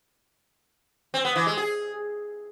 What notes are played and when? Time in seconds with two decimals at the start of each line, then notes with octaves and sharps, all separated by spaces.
1.14 C4
1.25 B3
1.36 E3
1.47 G#3
1.57 G#4